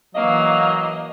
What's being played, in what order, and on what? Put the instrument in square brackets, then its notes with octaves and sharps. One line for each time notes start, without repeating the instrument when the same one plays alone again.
[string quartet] E3 A#3 [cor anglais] F#3 [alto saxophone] D#5 [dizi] F5